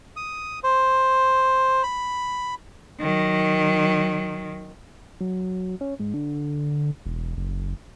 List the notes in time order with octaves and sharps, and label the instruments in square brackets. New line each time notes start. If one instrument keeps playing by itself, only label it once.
[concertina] D#6
C5
B5
[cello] D#3 F#3
[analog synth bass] F#3
C#4
G#2
D3
E1
F#1